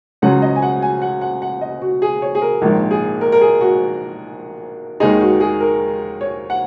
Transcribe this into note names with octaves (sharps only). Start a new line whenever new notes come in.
C#2 C#3 F#3 C#4 F#5
D#5
G#5
F#5
G#5
F#5
F#5
F#5
D#5
F#4
G#4
C#5
G#4
A#4
A#1 G#2 D#3 A#3 A#4
G#4
A#4
A#4
G#4
F#4
D#2 D#3 G#3 D#4 G#4
F#4
G#4
A#4
C#5
F#5